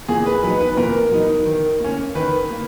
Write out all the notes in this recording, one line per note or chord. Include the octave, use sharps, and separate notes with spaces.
A#2 G#4
B4
F#3 B3 D#4 B4
B4
A#2 A#4
F#3 B3 D#4
D#3
A#3 C#4
D#3 B4
A#3